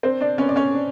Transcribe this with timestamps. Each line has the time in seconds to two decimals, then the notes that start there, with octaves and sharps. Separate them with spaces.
0.03 C4 D4 C5
0.21 D4 D5
0.38 B3 C#4 C#5
0.49 D5
0.56 C#4 C#5
0.74 D4